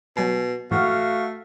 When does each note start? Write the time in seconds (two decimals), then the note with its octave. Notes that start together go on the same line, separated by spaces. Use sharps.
0.17 B2 F#3 G#5
0.71 G#2 E3 A3 F#4 F5 C#6 F6